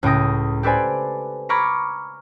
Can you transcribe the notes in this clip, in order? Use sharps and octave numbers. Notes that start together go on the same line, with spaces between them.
C#2 A2 C#4 G5 D#6 A#6
G4 A4 B4 C5 D5 G#5
A#5 B5 C#6 D6 F6 G#6